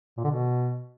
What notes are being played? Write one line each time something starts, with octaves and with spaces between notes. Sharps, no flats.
A#2
D3
B2